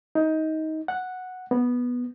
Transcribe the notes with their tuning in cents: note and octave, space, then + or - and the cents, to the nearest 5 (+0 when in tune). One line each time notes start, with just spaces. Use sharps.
D#4 +20
F#5 -5
B3 -10